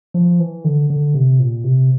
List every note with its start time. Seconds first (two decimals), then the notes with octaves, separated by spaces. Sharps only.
0.14 F3
0.40 E3
0.64 D3
0.90 D3
1.14 C3
1.40 A#2
1.64 C3